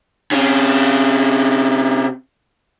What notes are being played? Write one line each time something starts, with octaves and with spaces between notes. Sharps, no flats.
C3 C#4